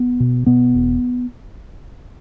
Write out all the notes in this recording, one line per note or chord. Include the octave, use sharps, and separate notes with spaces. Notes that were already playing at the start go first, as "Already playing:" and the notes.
Already playing: B3
B2
B2 B3
E1